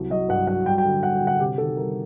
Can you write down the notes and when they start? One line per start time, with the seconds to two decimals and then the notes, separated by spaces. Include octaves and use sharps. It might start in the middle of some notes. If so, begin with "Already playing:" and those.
Already playing: C2 F#3
0.10 F#3 D#5
0.29 G2 F#5
0.47 F#3 F#5
0.66 G3 G5
0.78 G5
0.84 D3
1.03 G3 F#5
1.16 G5
1.22 D3
1.27 F#5
1.40 C3 G4
1.58 D#3 A4
1.77 G3 A#4